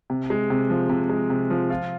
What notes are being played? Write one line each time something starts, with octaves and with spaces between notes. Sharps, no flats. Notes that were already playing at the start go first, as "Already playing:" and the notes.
C3
G#3
C3
F3
C3
G#3
C3
F3
F4